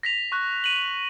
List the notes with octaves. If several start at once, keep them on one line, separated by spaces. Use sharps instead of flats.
A#6 B6 F7
C#6 F#6
D#7 F#7